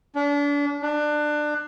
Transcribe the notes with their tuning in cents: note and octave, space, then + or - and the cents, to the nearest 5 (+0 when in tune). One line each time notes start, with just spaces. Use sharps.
D4 -35
D4 +20